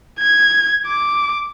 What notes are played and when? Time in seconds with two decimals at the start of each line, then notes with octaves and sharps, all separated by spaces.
0.20 G#6
0.87 D6